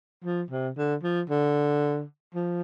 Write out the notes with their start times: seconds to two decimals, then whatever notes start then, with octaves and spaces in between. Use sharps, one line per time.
0.24 F3
0.51 C3
0.77 D3
1.03 F3
1.30 D3
2.34 F3